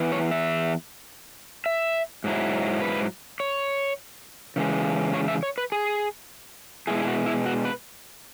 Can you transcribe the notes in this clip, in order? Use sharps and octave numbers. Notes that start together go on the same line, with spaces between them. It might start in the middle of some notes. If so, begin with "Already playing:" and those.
Already playing: E2 E3
C#5
E5
E5
G#2 F#3 E4
B4
C#5
C#3 E3 G#3
C#5
E5
C#5
B4
G#4
B2 G#3 E4 G#4
G#4
F#4
E4
F#4
B4